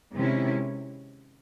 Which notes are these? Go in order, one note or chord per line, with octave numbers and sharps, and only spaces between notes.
C3 D#3 G#3 C#4 E4